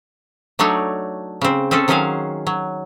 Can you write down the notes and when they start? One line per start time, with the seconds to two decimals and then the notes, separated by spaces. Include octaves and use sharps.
0.59 F#3 A3 D4 D#4 C#5 D5
1.41 C#3 C4
1.71 C4 C#4 G#4 A4
1.88 D#3 F#3 C#4 G#4 C5 F5
2.47 F#3